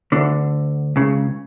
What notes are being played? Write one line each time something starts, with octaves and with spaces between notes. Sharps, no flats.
D2 D3
C#2 C#3